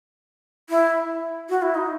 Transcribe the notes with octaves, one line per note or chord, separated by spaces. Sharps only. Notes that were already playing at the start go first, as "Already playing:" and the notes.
E4
F#4
E4
D#4